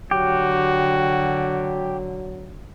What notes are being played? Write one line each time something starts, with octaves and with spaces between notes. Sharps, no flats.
D3 F#3 F#4 G4